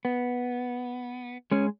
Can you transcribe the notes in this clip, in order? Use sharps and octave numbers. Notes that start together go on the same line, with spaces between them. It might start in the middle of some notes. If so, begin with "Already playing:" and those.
B3
G#3 C#4